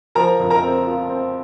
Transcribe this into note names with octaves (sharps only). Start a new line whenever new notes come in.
F3 A#4 A#5
F2
A#4 A#5
C4
F4
C4